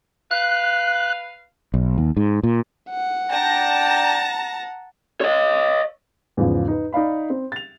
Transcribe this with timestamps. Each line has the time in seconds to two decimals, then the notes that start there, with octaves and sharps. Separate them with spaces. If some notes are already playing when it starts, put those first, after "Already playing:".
0.31 B4 F5 F#6
1.74 B1
1.98 D#2
2.17 G#2
2.43 A#2
2.90 F#5
3.30 D4 G5 A5 A#5 A#6
5.21 C#5 D#5
6.37 E2 G#2 C#3 F3
6.68 D#4 B4
6.93 D#4 D5 F5 B5
7.30 C4
7.52 A6 F7